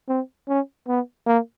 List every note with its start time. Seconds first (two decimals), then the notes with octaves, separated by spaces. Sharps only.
0.08 C4
0.48 C#4
0.88 B3
1.26 A#3